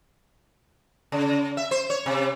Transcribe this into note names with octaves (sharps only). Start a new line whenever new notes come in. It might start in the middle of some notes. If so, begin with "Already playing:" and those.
C#3
E5
C5
C#5
C3